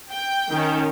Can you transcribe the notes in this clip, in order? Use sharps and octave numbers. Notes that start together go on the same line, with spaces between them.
G5 G6
D#3 C#4